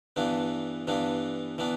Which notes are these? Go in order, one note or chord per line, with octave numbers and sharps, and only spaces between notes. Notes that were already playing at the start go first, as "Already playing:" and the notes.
G2 E3 B3 D4
G2 E3 B3 D4
E3 B3 D4